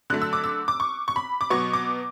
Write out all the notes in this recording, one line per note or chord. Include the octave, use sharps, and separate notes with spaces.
D3 F#3 A3 F#6
E6
D6
E6
D6
C#6
C#6
B5
D6
B2 F#3 B3 C#6
D6